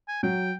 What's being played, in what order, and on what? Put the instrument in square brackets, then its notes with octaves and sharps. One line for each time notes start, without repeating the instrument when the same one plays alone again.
[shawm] G#5
[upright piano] F#3 [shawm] G5